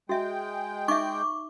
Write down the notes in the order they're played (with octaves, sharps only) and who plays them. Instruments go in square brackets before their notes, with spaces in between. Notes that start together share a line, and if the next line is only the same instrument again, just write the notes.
[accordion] G#3 G5 [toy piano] F#4 E5
[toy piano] D#4 E5 [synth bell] C#6 D6